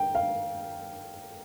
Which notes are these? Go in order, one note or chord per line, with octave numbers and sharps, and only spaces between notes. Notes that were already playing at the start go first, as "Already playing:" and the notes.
Already playing: G5
F5